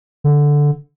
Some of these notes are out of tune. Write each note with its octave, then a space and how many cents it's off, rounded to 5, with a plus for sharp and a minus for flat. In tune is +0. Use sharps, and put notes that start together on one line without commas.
D3 -5